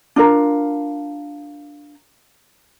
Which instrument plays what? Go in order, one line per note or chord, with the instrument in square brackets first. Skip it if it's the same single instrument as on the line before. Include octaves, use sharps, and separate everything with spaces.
[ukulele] D4 F4 A#4